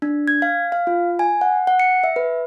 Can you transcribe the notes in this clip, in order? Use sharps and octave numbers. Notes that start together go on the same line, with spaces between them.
D4
G#6
F5
F5
F4
G#5
F#5
F#5
C#7
E5
B4